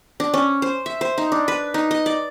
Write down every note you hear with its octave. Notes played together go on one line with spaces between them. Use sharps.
D4
C#4
C5
E5
C5
D#4
D4
B4
D#4
D#5
D5